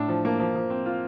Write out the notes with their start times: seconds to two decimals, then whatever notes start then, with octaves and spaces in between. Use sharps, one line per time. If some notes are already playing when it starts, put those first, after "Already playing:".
Already playing: A2 D4 A5
0.08 F3
0.25 A#3
0.39 F3
0.55 F3
0.70 C4
0.86 F4